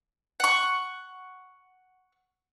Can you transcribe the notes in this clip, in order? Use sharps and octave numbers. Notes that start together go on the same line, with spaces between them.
F#5 C#6